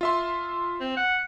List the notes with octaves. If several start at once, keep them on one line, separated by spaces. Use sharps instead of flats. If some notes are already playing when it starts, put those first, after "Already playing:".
F4 E5 C6
C4
F#5